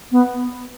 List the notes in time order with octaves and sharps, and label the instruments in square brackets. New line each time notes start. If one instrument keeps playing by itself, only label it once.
[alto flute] B3